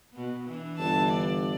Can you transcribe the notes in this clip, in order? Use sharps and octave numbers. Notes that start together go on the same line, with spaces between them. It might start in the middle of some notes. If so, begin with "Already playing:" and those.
B2 B3
E3 D4
G1 A5
D5